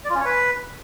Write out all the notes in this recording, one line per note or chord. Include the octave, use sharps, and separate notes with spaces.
D5
F4
C#4
C#5
B4